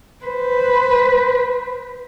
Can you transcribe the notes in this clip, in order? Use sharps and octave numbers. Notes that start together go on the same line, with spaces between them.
B4 C5